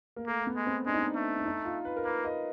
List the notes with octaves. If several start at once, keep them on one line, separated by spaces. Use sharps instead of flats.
A#3
A3 A#3
B3
G#3
C4
G#3 D4
D#4
D4
A3
D4
D#4
F4
B4
A#4
A#3 B4
D#5